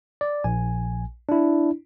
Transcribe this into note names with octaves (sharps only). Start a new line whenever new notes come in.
D5
A#1 G#5
D4 E4